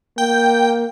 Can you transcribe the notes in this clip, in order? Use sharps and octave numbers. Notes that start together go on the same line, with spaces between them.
A#3 G5